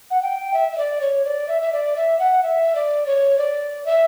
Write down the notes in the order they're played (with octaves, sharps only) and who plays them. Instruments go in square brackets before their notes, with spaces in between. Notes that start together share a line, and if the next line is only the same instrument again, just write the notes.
[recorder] F#5
G5
E5
E5
D5
C#5
D5
E5
E5
D5
E5
F#5
E5
D5
C#5
D5
E5